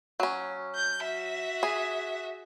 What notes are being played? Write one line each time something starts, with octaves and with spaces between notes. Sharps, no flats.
F#3 C#4
G6
F#4 E5
G#4